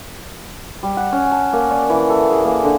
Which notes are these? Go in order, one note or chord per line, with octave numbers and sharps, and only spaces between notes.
G3
F#5
C#4
A5
A#3
D5
E3
A4
G#4
A#3
D3